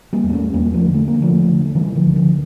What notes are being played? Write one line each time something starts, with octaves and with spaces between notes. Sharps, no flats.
G3 A#3
E2
A#3
A3 C#4
E2 G3 A#3
F3 A3
D3
A3
A#3
D3
F3 A3
D3
A3
C#3 E3 G3
D3 F3
C#2
D3 F3